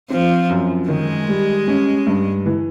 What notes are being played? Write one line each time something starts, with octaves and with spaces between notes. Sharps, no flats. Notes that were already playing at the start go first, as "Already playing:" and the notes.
F3 C4
F#2
D#3 G#3
G3
C#4
G2
E3